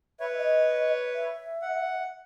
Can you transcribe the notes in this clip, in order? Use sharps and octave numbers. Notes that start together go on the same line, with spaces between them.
B4 C#5 E5
D#5
E5
F#5